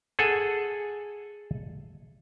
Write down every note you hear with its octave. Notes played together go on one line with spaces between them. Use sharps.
G#4 A4 F#5 G#5